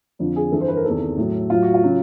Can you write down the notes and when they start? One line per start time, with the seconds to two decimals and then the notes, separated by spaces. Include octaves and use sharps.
0.19 F2 D3 F3
0.36 G#4
0.52 G2 E3 A4
0.61 C5
0.68 B4
0.77 A#4
0.85 E2 C3 D#3 A4
1.17 A2 F#3
1.50 A2 F#3 F4
1.63 F#4
1.74 F4
1.83 C#3 F#3